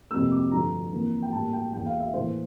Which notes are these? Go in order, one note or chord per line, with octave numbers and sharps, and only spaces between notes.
F2 C3 G3 A#3 E6
D6
G2 D3 F3 A3 A#5
F2 E3 A#3
G5
A2 G3 A#3 A5
G5
E2 E3 A#3 G5
F5
E5
A2 E3 A#3 C5